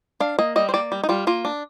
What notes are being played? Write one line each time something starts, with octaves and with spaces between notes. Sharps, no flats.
D4 F5
A#3 D#5
G3 D#5
C5
A#3 D5
G3
D#4
G3 F4
A#3 F4
D4